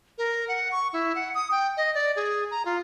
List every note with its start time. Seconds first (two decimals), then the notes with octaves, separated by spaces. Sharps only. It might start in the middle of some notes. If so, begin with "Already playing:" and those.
0.18 A#4
0.48 F#5
0.72 C#6
0.93 E4
1.15 F#5
1.35 D#6
1.51 G5
1.77 D#5
1.95 D5
2.16 G#4
2.51 A#5
2.65 F4